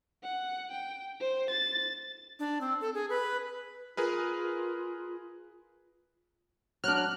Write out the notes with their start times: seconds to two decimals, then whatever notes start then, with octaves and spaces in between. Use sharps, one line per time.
0.24 F#5
0.71 G5
1.20 C5
1.50 A6
2.39 D4
2.61 C4
2.81 A4
2.94 G#4
3.10 B4
3.97 F4 G#4 A#4 B4
6.84 F#3 D4 F6 F#6